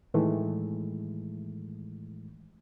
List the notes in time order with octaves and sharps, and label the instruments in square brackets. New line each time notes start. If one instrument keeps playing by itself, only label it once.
[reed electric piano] A2 D#3 E3 G#3 A3